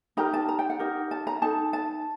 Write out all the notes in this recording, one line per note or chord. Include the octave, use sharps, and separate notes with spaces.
D#4 G4 A#4 A#5
A5
A#5
G5
F#5
D#4 G4 A#4
A5
A#5
D#4 A4 A5
A5